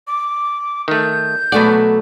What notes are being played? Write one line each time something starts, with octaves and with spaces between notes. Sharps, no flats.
D6
D#3 A3 G6
B2 F#3 A3 D5 F#5